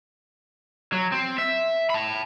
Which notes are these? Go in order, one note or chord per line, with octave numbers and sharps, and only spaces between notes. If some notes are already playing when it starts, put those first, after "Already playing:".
F#3
C4
E5
A5 B5